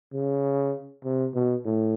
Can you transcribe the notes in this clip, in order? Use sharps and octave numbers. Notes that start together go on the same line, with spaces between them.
C#3
C3
B2
A2